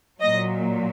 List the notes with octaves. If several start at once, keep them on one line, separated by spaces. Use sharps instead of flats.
A#2 F#3 D#5